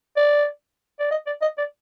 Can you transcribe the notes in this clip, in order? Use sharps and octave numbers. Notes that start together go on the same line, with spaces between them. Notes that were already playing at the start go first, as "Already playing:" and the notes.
D5
D5
D#5
D5
D#5
D5